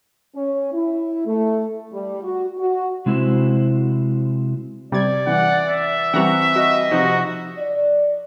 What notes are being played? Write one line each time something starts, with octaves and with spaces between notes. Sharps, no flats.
C#4
E4
A3
G3
F#4
F#4
C3 G#3 C4 E4 F#4 C5
C3 G3 D5 G#6
E3 F#5
E5
E3 G3 C4 F#5 A#5 C#6
F#4 D#5
C3 F3 D#4 F#4
D5